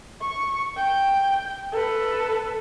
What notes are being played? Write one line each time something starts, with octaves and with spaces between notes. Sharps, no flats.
C#6
G5
A4 B4